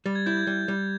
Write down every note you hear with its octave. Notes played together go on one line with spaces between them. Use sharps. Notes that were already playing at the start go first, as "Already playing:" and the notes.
G3 A6
G#6
E4 G6
G#6
G3 G6
G3